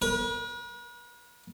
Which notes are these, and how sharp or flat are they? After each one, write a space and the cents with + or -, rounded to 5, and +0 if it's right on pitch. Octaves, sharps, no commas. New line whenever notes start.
B4 -45